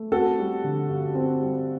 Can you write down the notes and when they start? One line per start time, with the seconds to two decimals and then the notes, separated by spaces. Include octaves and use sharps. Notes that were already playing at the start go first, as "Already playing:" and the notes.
Already playing: A3
0.12 C4 F#4 A4
0.38 G3
0.64 D3
0.89 G2
1.15 C4
1.41 G3